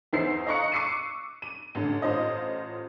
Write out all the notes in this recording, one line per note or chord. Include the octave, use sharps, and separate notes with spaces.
E2 E3 D#4 C5 E6 C7
D#5 F5 A#5 C#6 F#6 C#7
C#6 D6 E6 C7 C#7 D#7
D#7
A1 D3
A1 F4 C5 D#5